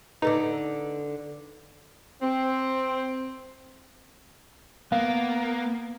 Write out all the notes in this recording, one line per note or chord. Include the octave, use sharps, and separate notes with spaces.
D3 D#4 A4 B4
C4
A#3 B3 F5